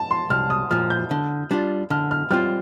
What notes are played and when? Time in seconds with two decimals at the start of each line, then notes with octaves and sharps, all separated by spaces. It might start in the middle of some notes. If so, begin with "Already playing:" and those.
Already playing: A5
0.11 C6
0.30 C2 F6
0.50 D#6
0.71 A#2 F3 F6
0.90 G6
1.11 D3
1.51 G3 D4 F4
1.90 D3 F6
2.11 F6
2.31 G3 C4 F4 F6